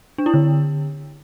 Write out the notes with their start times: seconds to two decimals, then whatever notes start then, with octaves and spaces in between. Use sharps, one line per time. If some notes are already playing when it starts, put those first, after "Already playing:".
0.18 D4
0.26 E4
0.34 D3